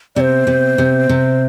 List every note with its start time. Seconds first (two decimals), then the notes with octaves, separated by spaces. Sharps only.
0.16 C3 C5 D5
0.47 C3
0.78 C3
1.09 C3